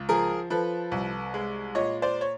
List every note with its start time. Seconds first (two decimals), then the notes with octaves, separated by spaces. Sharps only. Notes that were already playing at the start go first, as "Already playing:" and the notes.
Already playing: C#2
0.09 F3 G#4 A#4
0.50 F3 A4 B4
0.91 C2
1.34 G#3
1.75 A#2 C#5 D#5
2.02 C5 D5
2.21 C#5